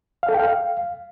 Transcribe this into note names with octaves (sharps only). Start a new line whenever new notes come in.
F5
A4
G5
F5